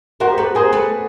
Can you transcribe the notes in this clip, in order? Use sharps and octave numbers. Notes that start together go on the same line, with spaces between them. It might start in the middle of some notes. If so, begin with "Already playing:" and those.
F#4 A#4 C5
G4
A4 B4
G4
G#4 A#4 C5
A4 B4